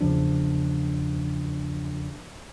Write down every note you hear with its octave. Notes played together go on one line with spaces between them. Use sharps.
E2 C#3 F3 D4